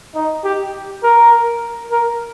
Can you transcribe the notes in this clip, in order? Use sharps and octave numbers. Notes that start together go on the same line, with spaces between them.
D#4
G4
A#4
A#4